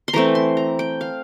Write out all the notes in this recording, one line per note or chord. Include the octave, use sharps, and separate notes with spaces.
C6
E3 A3 C4 A#5
C6
A#5
G5
F5